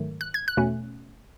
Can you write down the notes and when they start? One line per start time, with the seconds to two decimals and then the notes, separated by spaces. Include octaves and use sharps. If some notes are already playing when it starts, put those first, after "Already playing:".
Already playing: G#2 D#3 F#3 A3
0.21 F#6
0.34 G#6
0.48 F#6
0.57 E2 B2 A3 C#4